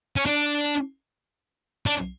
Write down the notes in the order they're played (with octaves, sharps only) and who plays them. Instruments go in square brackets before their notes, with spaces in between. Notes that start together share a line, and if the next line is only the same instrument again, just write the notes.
[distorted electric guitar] C#4
D4
D4